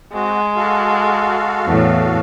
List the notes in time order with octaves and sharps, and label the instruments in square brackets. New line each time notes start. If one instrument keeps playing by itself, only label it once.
[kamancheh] G#3 [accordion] C4 F#4
[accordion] F#4 A4 F5
[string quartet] E2 A2